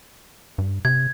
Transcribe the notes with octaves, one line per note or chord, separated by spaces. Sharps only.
G2
C3 G#6